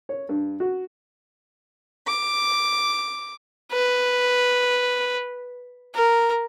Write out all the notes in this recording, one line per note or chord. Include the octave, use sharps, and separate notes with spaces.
C#5
G2
F#4
D6
B4
A#4